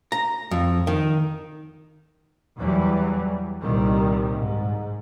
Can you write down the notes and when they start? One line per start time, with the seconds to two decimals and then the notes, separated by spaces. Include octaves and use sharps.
0.12 A#5
0.51 F2
0.87 D#3
2.58 E2 E3 F#3 G3
3.62 C2 A#2 D#3 G3
4.37 G#2